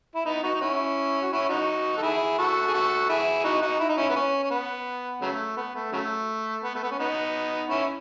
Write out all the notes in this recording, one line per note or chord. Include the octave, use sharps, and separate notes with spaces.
E4
B3 D#4
D#4 F#4
D#4
C#4 E4
F#4
C#4 E4
D#4 F#4
A4
E4 G#4
F#4 A4
G#4
F#4 A4
E4 G#4
G#4
D#4 F#4
D#4 F#4
E4
D#4
C#4 E4
B3
C#4
C#4
B3
C#3 F#3 A3
B3
A3
C#3 F#3 A3
B3
A3
B3
C#4
B3 D#4
C#4 E4